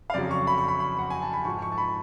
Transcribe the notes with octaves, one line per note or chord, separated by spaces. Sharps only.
F5
F2 C#3 F#3 D5
C#6
B5
C#6
B5
B5
F#5
G#5
A5
B5
G#2 F3 C#6
C#6
A5
B5